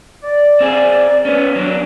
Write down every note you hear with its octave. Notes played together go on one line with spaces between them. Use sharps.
D5
C4 G#4
B3 C#4
F#3 D4